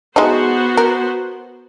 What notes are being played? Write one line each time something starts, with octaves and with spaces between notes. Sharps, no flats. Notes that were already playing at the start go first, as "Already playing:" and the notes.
G#3 A3 B3 D#4 F#4 C5
A#4